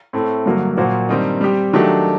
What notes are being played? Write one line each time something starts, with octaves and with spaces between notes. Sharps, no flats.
A2 A3 C4
G2 D3 F#3 A#3
A#2 F#3 A#3 F#4 C5
G2 D#3 G3 C4 D#4
G3 C4 G4
D#3 F#3 A3 D4 G4